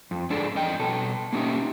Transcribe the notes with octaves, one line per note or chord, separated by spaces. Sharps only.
F2
G#2 D4 G#4 A4 D5
F2 D#5 G5
B2 A4
A#3 C#4 D#4 G4 E5